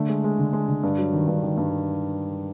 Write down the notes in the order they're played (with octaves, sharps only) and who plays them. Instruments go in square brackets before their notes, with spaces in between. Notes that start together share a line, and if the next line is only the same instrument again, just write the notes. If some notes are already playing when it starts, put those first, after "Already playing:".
Already playing: [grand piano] D3 A3
G#3
G#3
D3
G#3
D3
G2
F#3
D#3
G2
D#3
G2